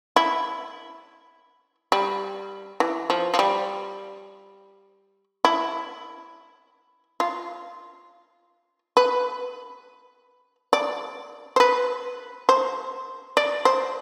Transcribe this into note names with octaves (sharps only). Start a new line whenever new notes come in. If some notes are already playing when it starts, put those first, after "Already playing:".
E4
G3
E3
F3
F3
G3
E4
F4
B4
D5
C5
B4
C5
D5
C5